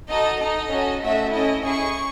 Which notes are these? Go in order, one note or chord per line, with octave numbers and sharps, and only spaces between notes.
D#4 F#4 A4 D#5
D#4 A4 D#5
C#4 F#4 A4
A3 C#4 F#4 A4 E5
C#4 E4 A4 D#5
C#4 E4 G#4 C#6